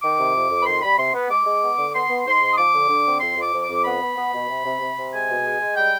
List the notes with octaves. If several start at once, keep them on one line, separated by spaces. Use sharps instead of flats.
D#3 D6
C3
F2
F2
B5
D#3 C6
G3 B5
C3 C6
B3
G#3 D6
G#3
B3
D3
B3 C6
B3
G#2 C6
G#2
D#6
F3 D6
D3
D3
C4
F2 C6
F2
D6
F2
D6
F2
B3 B5
B3
B3
B2
C3
C3
C3
C3
G#3 G#5
B2
G#3
G#3
G3 G5